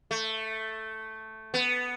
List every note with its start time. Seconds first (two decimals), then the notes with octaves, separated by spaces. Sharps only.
0.11 A3
1.54 B3